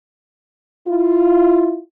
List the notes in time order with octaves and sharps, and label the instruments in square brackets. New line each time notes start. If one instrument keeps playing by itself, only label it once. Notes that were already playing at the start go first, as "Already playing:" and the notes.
[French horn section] E4 F4